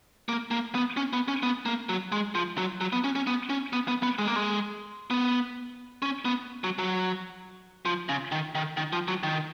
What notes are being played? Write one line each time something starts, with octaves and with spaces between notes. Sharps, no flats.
A#3
A#3
B3
C#4
B3
C#4
B3
A#3
F#3
G#3
F3
F#3
F#3
B3
C#4
C#4
B3
C#4
B3
B3
B3
G#3
A#3
G#3
B3
C#4
B3
F#3
F#3
F3
C#3
D#3
D#3
D#3
F3
F#3
D#3